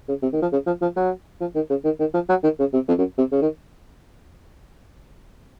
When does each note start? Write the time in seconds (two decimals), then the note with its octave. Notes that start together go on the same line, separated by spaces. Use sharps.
0.09 C#3
0.22 C3
0.33 D#3
0.42 F3
0.52 C#3
0.67 F3
0.82 F3
0.96 F#3
1.41 F3
1.55 D#3
1.70 C#3
1.85 D#3
2.00 D#3
2.14 F3
2.29 F#3
2.43 D#3
2.59 C#3
2.73 C3
2.88 F2
2.98 F#2
3.18 C3
3.32 C#3
3.42 D#3